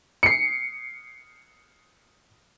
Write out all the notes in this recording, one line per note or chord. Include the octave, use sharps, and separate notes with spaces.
C7 C#7